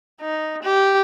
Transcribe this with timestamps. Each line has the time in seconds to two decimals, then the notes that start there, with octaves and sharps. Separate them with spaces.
0.21 D#4
0.63 G4